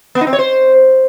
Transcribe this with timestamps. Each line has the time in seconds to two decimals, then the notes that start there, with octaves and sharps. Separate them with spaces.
0.15 B3
0.21 D#4
0.27 C4
0.33 C#5
0.39 C5